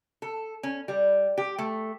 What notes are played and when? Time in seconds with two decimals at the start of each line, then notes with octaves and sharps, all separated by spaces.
0.22 A4
0.63 C#4
0.88 G3
1.38 G4
1.59 A3